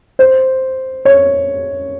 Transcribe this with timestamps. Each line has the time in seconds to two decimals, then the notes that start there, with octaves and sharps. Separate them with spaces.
0.19 C5
1.05 C#5